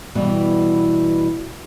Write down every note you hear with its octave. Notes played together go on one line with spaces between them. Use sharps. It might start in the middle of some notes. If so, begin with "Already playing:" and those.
B2 E3 G3